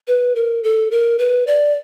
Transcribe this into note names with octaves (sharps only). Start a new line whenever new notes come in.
B4
A#4
A4
A#4
B4
D5